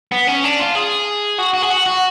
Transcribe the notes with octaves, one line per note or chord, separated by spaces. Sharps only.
B3
C#4
D4
F4
G#4
F#4
F#4
G#4
F#4
F#4